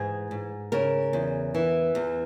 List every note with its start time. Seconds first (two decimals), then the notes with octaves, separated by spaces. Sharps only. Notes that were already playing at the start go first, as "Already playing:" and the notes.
Already playing: G#2 E3 G#4
0.31 G#2
0.72 C#3 A#4
1.13 E2
1.54 E3
1.95 E2